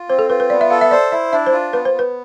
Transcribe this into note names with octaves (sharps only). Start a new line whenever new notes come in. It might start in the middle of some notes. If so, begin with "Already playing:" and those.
Already playing: F4
C4 C5
A4
F4 B4
B4
B3 D5
E5
A4 F5
E5
C5 D5
E4 E5
D4 E5
C5
F4
B3 B4
C5
B3
B4